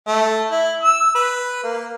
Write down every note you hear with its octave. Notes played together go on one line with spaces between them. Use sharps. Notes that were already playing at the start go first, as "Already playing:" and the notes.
A3
E4
E6
B4
A#3